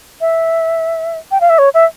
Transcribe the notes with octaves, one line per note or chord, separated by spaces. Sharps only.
E5
G5
F5
E5
C#5
E5